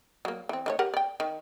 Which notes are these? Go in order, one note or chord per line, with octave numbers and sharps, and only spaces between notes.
F#3 A#3
E3 C4
D#3 A3 C#5
G4 A#4 F#5
D5 G5
D#3